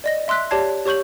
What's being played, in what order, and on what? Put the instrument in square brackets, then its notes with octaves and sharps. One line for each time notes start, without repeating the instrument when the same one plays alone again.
[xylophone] D5 D#5 A#6
E5 C6 E6 F#6 B6
G4 C#5 D5 A5 G#6 C7
G4 C#5 C#6 G6 F#7